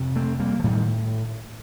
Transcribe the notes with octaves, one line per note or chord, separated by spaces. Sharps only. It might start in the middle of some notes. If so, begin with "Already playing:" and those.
Already playing: F2 C3
A3 C4
G3 A#3
F3
A2 D#3 G3